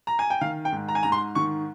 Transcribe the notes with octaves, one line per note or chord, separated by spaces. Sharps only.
A#5
G#5
G5
D#3 F5
G5
G#2
A#5
G#5
G#2 A#5
C6
D#3 C#6